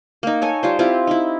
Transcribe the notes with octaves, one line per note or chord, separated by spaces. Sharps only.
A#3 D#4
A4 C#5 G#5
G3 F4 C5
C4 E4 F4 G4
D#4 E4